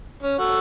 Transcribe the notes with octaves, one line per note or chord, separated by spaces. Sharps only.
C#4
F#4 A4